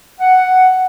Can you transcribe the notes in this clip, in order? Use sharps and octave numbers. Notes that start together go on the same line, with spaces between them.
F#5